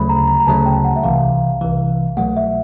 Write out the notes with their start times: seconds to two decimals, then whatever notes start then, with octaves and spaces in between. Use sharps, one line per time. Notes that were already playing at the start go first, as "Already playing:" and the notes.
Already playing: D2 C#3 F#3 A3 B5
0.09 A#5
0.28 A#5
0.40 A#5
0.47 D2 C#3 F#3 A3 A5
0.66 G5
0.85 F#5
0.96 E5
1.03 C2 C3 E3 F5
1.61 C2 C3 E3
2.17 C2 B2 F#3 A3 F#5
2.37 E5